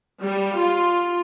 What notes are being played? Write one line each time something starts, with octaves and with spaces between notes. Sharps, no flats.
G3
F4